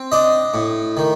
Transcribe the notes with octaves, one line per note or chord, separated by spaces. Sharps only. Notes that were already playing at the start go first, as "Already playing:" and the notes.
Already playing: C4
D4 D#5
A2
D#3